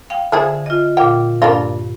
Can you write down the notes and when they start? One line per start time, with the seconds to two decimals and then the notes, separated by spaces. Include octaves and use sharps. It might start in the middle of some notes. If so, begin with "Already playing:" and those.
0.10 F5 G5
0.32 D3 F3 G#4 E5
0.66 F4 D#5
0.97 A#2 F4 F5 G5
1.42 G2 A#3 D4 F4